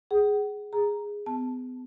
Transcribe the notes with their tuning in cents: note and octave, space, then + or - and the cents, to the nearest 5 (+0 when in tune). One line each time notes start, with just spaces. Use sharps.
G#4 +0 F#5 +35
G#4 -10 A#5 +0
B3 +40 A5 +0